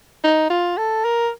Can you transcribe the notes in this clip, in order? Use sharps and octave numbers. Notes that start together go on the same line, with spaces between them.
D#4
F4
A4
A#4